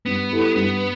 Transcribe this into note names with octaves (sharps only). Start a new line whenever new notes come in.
G2 B3
G3 E4 A4
G2 B3